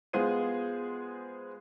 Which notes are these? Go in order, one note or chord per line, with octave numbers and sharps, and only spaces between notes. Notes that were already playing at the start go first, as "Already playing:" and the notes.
G#3 B3 F4 G#4 C5 D#7